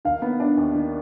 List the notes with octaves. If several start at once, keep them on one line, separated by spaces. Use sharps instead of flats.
D#3 F5
B3
D4
D#2
D#3